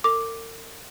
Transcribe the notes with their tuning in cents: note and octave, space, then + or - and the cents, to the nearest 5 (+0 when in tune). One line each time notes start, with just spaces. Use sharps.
A#4 -45 D6 +0